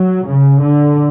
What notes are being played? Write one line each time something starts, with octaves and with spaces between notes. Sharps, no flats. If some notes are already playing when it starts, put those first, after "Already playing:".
Already playing: F#3
C#3
D3